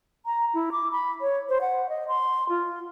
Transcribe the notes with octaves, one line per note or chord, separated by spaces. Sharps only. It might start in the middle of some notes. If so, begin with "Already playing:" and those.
A#5
E4
D6
B5
C#5
C5
F#5
D#5
C6
F4